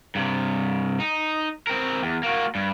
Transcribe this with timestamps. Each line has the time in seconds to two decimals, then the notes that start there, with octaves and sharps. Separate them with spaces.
0.15 G2 C3
1.00 D#4
1.67 C4 A#4
2.02 E2
2.23 A#3 F#4
2.55 G2